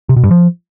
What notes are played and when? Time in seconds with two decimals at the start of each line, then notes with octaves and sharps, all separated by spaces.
0.09 C3
0.16 B2
0.24 G2
0.31 F3